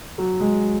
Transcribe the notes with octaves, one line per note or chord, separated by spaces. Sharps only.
F#3
G#3